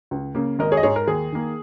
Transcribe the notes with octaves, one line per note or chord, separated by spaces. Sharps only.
C#2
C#3 A#3
G#1 A#4 D#5
G#4 C#5
D#5
G#2 G#3 G#4 C#5
A#4
D#2 G#4
D#3 A#3